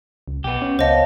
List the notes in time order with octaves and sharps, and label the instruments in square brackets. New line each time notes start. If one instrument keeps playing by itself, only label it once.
[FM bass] C#2
[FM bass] B1 [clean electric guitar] B3 G4
[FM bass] C#4
[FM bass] C#2 [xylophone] C5 D#5 [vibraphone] C#5 F5 A5